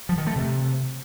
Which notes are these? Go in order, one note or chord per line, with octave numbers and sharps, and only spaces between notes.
F3
D#3
A3
C3